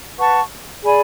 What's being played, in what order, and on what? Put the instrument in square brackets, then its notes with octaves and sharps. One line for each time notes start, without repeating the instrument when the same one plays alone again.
[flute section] B4 F#5 A5 C#6
G#4 D5 G#5 B5